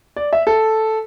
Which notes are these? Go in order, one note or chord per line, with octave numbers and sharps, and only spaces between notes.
D5
E5
A4